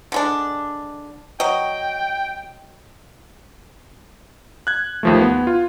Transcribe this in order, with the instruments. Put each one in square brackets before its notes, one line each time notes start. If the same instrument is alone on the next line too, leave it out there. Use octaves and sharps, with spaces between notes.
[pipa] D3 G#3 D4
[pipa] F#3 D#5 [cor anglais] G5
[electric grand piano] F#6 G#6
D#2 F3 A3
B3
F4